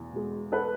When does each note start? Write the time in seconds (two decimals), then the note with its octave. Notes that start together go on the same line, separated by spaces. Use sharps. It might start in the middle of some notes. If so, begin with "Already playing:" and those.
Already playing: E2 B2
0.13 B2 G#3
0.52 A4 B4